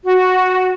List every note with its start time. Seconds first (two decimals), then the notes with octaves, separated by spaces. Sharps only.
0.04 F#4